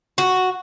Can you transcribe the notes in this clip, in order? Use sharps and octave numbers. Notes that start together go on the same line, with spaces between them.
F#4